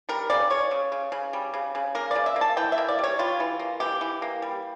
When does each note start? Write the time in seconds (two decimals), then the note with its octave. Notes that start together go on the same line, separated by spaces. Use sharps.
0.09 G3 A#4
0.30 C#3 D5
0.50 C#3 C#5
0.71 C#3
0.92 C#3
1.12 C#3
1.33 G3
1.54 C#3
1.75 C#3
1.95 A#3 A#4
2.11 C#3 D5
2.26 E5
2.36 A#3
2.41 A5
2.57 E3 G5
2.72 E5
2.78 A#3
2.88 D5
2.99 G3 C#5
3.19 G3 F4
3.40 E3
3.59 A#3
3.80 E3 G4
4.01 E3
4.22 A#3
4.42 G3